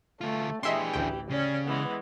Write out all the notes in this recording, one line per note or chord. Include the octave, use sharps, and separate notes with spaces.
D2 A3 F4
E3 D4 G4 G#4 D#5 E5 C6
A1 D2 G5
C#3 C#4 D5
E3 G#3 B3